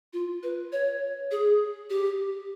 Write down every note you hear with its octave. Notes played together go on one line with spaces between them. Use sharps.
F4
B4
C#5
G#4
G4